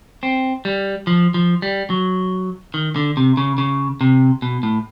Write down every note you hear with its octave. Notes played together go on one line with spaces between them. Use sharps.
C4
G3
F3
F3
G3
F#3
D#3
D3
C3
C#3
C#3
C3
B2
A2